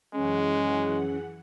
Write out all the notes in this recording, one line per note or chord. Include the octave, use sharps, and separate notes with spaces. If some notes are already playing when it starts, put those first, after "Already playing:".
F#2 E3 G#3 C#4 G#4 F#5